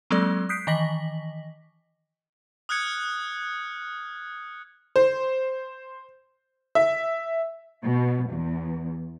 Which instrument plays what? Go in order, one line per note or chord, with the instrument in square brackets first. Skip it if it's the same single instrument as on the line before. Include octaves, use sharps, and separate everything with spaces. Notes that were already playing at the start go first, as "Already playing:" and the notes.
[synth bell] F#3 G#3 A#3 C4 A4 D5
D#6 F#6 G6 B6 C7 D7
D#3 E3 D#5 A#6 B6 F#7
[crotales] D#6 F6 F#6 G#6 C#7
[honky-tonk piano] C5
E5
[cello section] B2
E2